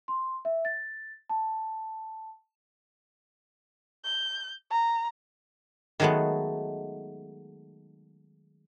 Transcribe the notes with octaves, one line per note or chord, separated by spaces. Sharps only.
C6
E5
A6
A5
G6
A#5
D#3 F#3 G#3 A3 B3